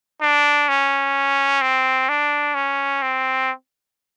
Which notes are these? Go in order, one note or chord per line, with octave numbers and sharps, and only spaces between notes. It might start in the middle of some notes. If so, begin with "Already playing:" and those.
D4
C#4
C4
D4
C#4
C4